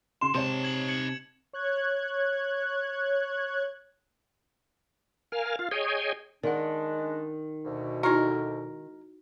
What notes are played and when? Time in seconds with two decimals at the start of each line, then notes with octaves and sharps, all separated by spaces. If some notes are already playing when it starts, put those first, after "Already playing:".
0.21 C#3 C6 E7
0.35 C3 G#3 D#4 C#5 A5
0.64 G#6 F#7
0.88 G#6 C#7 F#7
1.53 C#5 F#6 G#6
5.32 A#4 F5 G#5 F6
5.59 F4 F5
5.71 G#4 C#5 D#5 G5 G#5
6.43 D#3 G#3 D4 D5 F#5
7.65 D2 B2
8.03 G#3 D#4 E4 F#4 A#4